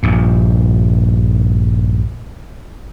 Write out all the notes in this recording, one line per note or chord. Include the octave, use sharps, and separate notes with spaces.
A#1 G2